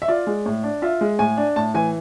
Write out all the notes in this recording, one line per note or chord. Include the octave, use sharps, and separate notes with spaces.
E5
F4 D5
G#3
A2
D4
F4 E5
G#3
A2 G#5
D4
A2 A5
E3 G#5